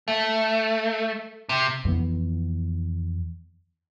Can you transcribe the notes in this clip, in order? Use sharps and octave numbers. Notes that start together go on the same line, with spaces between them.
A3
C3
F2 E3 B3